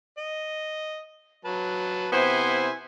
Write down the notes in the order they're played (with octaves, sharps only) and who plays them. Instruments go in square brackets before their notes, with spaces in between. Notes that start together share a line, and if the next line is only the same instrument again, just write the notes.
[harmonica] D#5
F#3 B4 A5
[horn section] C3 B3 C5 [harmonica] E4 G#5